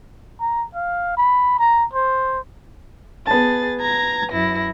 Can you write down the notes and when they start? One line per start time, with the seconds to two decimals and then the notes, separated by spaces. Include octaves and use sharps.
0.40 A#5
0.75 F5
1.17 B5
1.59 A#5
1.93 C5
3.27 B3 G#4 A5 A6
3.80 A#5 G#6 A#6
4.32 F#2 E4 A#6